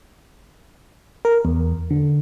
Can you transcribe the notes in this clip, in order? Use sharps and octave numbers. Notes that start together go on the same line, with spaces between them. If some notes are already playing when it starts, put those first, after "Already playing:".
A#4
E2
D3